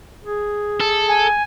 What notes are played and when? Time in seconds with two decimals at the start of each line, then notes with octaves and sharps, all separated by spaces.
0.25 G#4
0.81 A4
1.08 G#5